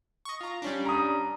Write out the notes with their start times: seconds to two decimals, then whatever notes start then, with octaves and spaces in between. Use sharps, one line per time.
0.25 D#5 C#6
0.41 F4 A#5
0.62 G3 C#4 D4
0.85 A#5 D#6